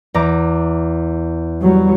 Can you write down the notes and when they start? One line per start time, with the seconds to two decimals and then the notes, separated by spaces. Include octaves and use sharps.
0.14 E2 A#5 D6
1.62 F#3 G3